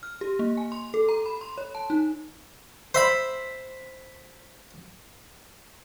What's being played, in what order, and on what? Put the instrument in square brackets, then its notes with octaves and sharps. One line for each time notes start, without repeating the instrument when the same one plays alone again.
[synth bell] F6
G4
A#3
G#5
C6
A4
A#5
B5
C6
C#5
A5
D#4
[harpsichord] C5 E5 B5